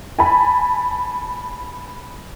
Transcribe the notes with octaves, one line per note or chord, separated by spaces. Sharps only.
G#5 A5 B5